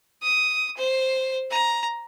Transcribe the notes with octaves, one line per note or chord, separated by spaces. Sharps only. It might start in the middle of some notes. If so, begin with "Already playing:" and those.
D#6
C5
A#5